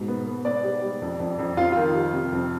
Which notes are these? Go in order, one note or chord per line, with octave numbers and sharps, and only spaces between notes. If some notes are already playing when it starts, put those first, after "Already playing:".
Already playing: G#2 B2
B3
B3
B3 D5
G3
G3
F2
F2
F2
F2 F4
D#3 F4
G3
C3
F2